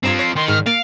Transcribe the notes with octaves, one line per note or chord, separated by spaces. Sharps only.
G2 F3 C4 A#5 G#6 E7
C#5 A#6 C7
D#3 C6
G#2 F6
A#3 F5 A6 D7